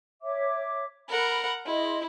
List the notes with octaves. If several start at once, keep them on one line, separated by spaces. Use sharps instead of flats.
C#5 E5 D6
A#4 F#5 B5
E4 G#4 D#5 C6